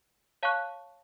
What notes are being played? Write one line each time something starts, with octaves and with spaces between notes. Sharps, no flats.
C#5 F5 A5 C#6 F#6